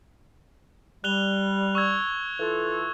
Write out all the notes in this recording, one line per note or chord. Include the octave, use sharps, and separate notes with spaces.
G3 F#6 F7 G7
C#6 E6 G#6
E3 F4 A4